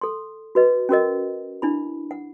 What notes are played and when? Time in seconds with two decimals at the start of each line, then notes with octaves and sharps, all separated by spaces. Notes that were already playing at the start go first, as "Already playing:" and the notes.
0.01 A4 C6
0.55 F#4 B4 D#5
0.89 C#4 F#4 A#4 D#5
1.62 D4 E4 B5
2.11 F#5